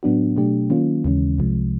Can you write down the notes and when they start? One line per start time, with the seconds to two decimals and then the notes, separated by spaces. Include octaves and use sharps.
0.03 A2 F#3 B3 D4 F#4
0.37 B2 F#3 A3 D4 G4
0.70 D#3 F#3 A#3 C#4 F4
1.04 D#2 C#3 E3 G#3 C#4
1.38 C2 C3 F3 G#3